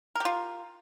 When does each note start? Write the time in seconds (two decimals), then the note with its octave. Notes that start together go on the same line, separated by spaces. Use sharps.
0.15 A#4
0.20 G4
0.25 F4